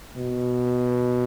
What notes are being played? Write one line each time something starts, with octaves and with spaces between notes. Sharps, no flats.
B2